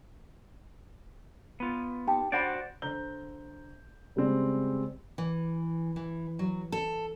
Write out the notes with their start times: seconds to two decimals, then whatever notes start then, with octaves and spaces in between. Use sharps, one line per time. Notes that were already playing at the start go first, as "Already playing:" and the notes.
1.60 B3 F4
2.07 D#4 G4 A5
2.32 D4 F#4 C5 D5 F#5 B5
2.82 D3 C5 A#5 G6 G7
4.16 C#3 G3 G#3 C4 D5
5.18 E3
5.96 E3
6.39 F#3
6.72 A4